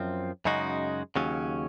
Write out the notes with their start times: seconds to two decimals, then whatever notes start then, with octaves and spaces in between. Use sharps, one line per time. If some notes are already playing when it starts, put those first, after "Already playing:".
Already playing: F#2 F3 C4
0.45 F#2 C#3 G#3 D#4 F#4
1.16 D#2 C#3 F#3 C#4